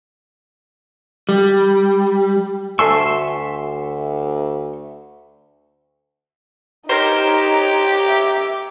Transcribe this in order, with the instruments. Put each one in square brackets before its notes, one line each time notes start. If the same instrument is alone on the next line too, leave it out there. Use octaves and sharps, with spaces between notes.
[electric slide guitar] G3
[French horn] D2 [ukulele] F#4 A4 G#5 [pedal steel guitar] E5 C6 C#6 [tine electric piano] E6
[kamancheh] D#4 [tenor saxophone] G4 [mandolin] A#4 C5 [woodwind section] C#5 A#5
[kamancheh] E5 D6